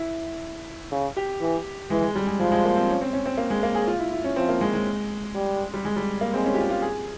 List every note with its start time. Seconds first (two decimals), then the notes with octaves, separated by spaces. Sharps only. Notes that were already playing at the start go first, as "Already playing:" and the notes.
Already playing: E4
0.92 C#3
1.17 G4
1.41 E3
1.90 E3 G#3
2.02 G#3
2.16 G3
2.27 G#3
2.40 F3 G#3
2.52 G#3
2.65 A#3
2.76 C4
2.89 C#4
3.01 C4
3.13 C#4
3.26 C4
3.38 A#3
3.50 G#3
3.63 A#3
3.75 G#4
3.87 F4
4.00 E4
4.12 E4
4.24 C#4
4.36 F3 C4
4.49 A#3
4.61 G#3
4.74 G#3
5.35 G3
5.74 G3
5.85 G#3
5.96 G3
6.21 A#3
6.34 G#3 C4
6.46 C#4
6.54 G4
6.58 F4
6.70 F4
6.82 G#4